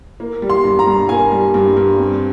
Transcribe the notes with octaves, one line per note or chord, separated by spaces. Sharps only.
A#3
G3
C6
G2
A#5
G2
A#3 G#5
G3
G2
G2
C4